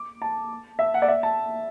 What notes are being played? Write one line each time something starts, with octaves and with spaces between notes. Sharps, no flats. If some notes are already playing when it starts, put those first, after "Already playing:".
Already playing: D6
A5
E5
F#5
D5
E5
A5